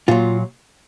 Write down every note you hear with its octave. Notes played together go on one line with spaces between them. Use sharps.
A#2 F#3 F4